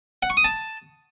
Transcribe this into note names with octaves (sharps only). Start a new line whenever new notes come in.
F#5
C#6
D#6
A5